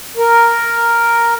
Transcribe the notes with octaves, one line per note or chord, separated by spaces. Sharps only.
A#4